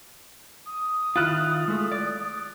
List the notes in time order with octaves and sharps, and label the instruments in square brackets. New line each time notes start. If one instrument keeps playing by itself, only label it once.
[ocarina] D#6
[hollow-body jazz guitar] D#3 E4 F4 [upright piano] F6 F#6 A6
[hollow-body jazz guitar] G#3 A3
D5